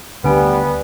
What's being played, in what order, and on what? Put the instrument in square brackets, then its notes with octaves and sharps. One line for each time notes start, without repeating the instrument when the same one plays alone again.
[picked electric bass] D2 D3 [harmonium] G3 [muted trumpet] B3 [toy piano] B4 G#5 B5